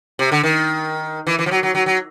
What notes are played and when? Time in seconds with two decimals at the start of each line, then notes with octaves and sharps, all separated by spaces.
0.19 C3
0.32 D3
0.43 D#3
1.27 E3
1.39 E3
1.46 F3
1.51 F#3
1.63 F#3
1.75 F#3
1.86 F#3